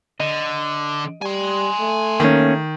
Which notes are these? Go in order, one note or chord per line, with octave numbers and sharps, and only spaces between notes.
D3 D#5
G3 G#5 C6
A3
D#3 A#3 C#4